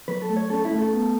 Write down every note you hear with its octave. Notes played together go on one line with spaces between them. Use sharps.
F#3 B4
A4
A3
C#5
C#4 A4
E4
A3
A4
B3